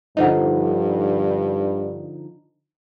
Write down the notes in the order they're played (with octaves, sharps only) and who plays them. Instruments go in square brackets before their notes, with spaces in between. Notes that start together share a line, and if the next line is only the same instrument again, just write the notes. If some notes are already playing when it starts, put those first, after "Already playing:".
[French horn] G2 [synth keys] D3 F3 D#4 [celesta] D#5 F#5